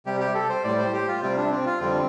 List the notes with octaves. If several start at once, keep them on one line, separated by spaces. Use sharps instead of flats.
C3 G3 G4
G4
A4
C5
A2 G3 D5
C5
G4
F4
C3 G3 C4
D4
C4
F4
F2 D3 G3 C4